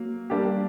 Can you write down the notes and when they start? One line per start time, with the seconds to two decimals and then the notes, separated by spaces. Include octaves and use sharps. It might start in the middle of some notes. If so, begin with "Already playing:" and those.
Already playing: F#3 A#3
0.30 G3 A#3 D4 G4